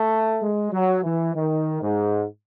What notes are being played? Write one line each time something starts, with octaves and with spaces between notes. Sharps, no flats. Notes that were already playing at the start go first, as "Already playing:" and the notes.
Already playing: A3
G#3
F#3
E3
D#3
G#2